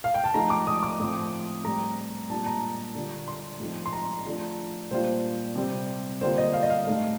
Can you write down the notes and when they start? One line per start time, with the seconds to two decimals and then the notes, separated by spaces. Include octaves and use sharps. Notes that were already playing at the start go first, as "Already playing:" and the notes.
0.04 F5
0.14 G5
0.24 A5
0.34 F3 A3 D#4 A#5
0.50 D6
0.67 D#6
0.83 D6
1.00 A2 F3 C4
1.64 A2 G3 C4 A#5
2.30 A#2 G3 D4 F4 A5
2.46 A#5
2.95 D3 G3 D4 F4
3.28 C6
3.60 A2 F3 A3 C4 D#4
3.86 C6
3.93 A#5
4.25 F3 A3 D4 F4
4.91 A#2 G3 D4 F4 C5
5.56 C3 G3 C4
6.21 D3 G3 A#3 F4 C5
6.38 D#5
6.53 F5
6.63 D#5
6.70 F5
6.86 A2 A3 D#4